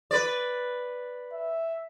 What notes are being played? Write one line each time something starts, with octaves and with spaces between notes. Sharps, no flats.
B4 D5
E5